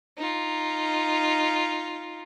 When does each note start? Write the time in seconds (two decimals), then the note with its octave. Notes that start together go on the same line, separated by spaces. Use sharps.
0.17 D#4 F4